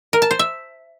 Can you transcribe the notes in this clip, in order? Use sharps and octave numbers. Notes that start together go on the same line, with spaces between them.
A#4
A5
C5
E5